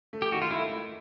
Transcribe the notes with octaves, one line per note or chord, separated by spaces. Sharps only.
A3
G4
D#3 F#4
F4
A3 E4
A3